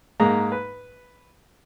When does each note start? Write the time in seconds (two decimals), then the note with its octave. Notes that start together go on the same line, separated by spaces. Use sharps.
0.20 G#2 G#3 A#3 D#4 A#5
0.52 B4